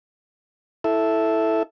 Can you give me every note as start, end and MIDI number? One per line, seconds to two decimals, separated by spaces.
0.84 1.63 64
0.84 1.63 69
0.84 1.63 76